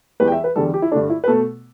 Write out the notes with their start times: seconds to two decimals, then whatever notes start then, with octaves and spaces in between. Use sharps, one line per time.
0.20 E2 E3 G3 B4
0.27 G5
0.32 E5
0.44 B4
0.56 E2 D3 G3 A4
0.74 G4
0.82 E4
0.92 G2 D3 A3 D4
1.10 E4
1.24 B4
1.28 B2 A3 A4